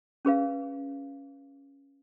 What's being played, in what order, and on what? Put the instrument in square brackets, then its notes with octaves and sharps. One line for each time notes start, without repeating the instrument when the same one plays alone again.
[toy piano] C#4 G#4 B4 F5